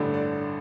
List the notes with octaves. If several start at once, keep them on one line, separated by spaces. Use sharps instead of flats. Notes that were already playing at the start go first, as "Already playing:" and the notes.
Already playing: A1 G2 D3 A3 D4
D5